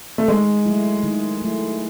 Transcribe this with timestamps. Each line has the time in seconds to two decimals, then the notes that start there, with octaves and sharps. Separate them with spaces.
0.18 A3
0.28 D#3 G#3
0.66 F#3 A3 E4
1.03 D#3
1.41 F#3 A3 E4